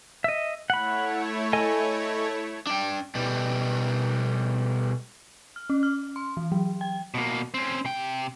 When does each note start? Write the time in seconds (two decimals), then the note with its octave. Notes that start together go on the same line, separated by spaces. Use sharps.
0.24 D#5 E5
0.70 A3 E4 C#5 F#5 B5
1.53 A4 D#5 G#5
2.67 D4 G5
3.15 B2 G3
5.56 F6
5.70 C#4
5.83 F6
6.16 C6
6.37 E3
6.52 F#3
6.81 G5
7.14 B2 A#3
7.54 C4 C#4
7.85 C3 G5